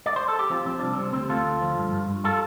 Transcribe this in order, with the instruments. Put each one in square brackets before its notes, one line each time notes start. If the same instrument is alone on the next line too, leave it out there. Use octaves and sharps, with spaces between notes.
[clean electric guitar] D5
C5
A4
G4
F3 C4 F4
F3 C4
C2 D4
C3 C4
D2 C4
D2 F4 A4
D2
F3
G2
G2
G2
G3 F4 A4